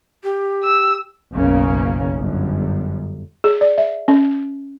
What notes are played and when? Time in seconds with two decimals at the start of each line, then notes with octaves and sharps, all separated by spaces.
0.24 G4
0.64 E6
1.34 F#1 B1 C#3 A#3 C#4
2.17 G1 F#2
3.44 G#4
3.61 D5
3.78 E5
4.08 C#4